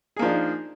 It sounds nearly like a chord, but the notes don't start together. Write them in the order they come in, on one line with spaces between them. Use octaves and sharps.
G#4 A#3 F3 D4 D#4